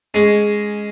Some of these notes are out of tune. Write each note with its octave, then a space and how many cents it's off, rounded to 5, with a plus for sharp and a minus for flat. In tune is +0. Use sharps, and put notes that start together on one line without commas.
G#3 +0 C#4 +5